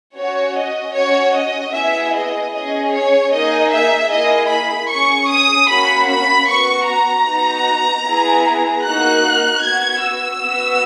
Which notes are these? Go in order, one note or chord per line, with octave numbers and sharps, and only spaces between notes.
C#4 F#4 C#5
D#5
C#4 F#4 C#5
D#5
B3 E4 G#4 E5
D#5
C#4 G#4 D#5
C#5
A#3 D#4 G#4 D#5
E5
A#3 E4 G#4 D#5
B5
C#4 G#4 C#6
D#6
A#3 C#4 F#4 B5
B5
B3 F#4 C#6
A#5
B3 D#4 F#4
B3 E4 G#4
A#3 D#4 F#4 F#6
B3 F#4 G#6
E6
B3 F#4